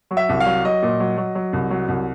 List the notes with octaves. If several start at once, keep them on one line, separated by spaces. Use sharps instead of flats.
F#3
E5
C2
F5
F#3
F#3 D#5
A#2
F#3
F#3
F#3
C2
F#3
C2